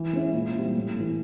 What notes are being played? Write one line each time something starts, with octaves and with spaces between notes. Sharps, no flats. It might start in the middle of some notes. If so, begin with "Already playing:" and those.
Already playing: E3
G#3 C#4 E4
A#2
G3 C4 E4
A2
E3 A3